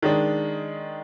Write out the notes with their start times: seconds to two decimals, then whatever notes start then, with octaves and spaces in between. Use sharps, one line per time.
0.02 D#3 G#3 D4